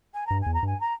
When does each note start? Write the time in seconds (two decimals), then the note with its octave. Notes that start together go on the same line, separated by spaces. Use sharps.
0.13 G#5
0.27 G2 A#5
0.41 G#5
0.46 E2
0.53 A#5
0.63 G2 G#5
0.80 A#5